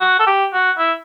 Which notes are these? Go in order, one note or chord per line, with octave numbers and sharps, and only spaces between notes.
F#4
A4
G4
F#4
E4